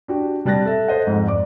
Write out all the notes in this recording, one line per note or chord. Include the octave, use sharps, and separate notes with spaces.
D4 F#4 G4
C3 G3 A5 F#6 A6 A#6
A4 E5
A4 C5 D#5 F#5
F2 G#2
D5 D6